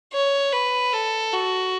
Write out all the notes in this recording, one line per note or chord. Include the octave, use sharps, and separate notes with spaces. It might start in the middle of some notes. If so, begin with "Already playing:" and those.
C#5
B4
A4
F#4